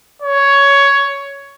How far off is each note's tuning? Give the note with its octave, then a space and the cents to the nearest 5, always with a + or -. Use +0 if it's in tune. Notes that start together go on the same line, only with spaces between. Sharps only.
C#5 +10